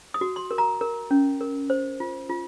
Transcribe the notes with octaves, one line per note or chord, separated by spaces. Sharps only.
D#6
F#4
C6
A#4
A#5
A#4
C#4
A#4
C5
F4
F4